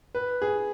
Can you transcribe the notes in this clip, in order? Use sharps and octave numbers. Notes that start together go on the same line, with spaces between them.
B4
G#4